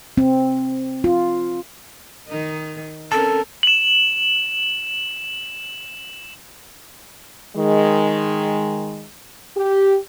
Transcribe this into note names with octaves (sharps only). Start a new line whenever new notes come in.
C4
F4
D#3 D#4
C4 C#4 A4 A#4 A5
E7 F#7
D#3 G#3
G4